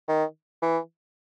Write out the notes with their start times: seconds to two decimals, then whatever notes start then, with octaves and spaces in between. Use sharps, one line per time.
0.08 D#3
0.62 E3